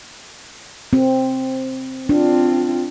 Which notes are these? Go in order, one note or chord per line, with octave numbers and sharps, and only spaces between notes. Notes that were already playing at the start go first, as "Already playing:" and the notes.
C4
C4 D4 F4